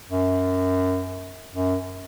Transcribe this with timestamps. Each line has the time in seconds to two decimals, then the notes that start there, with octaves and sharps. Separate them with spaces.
0.09 F#2
1.53 F#2